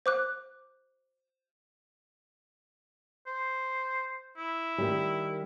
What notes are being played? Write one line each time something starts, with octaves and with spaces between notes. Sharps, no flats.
C5 D6 F#6
C5
E4
D#3 G3